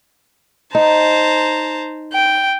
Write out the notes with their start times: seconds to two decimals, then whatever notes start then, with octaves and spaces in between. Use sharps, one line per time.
0.75 D#4 C5 A5 A#5
2.13 G5